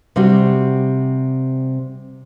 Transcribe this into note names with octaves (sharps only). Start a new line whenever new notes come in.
C3 G3 F#4